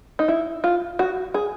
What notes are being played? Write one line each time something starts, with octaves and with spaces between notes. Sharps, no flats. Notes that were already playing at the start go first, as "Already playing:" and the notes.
D#4
E4
F4
F#4
G#4